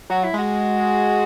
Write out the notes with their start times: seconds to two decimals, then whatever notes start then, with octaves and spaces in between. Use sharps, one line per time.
0.10 F#3 F#4
0.24 E4
0.34 G#3 F#4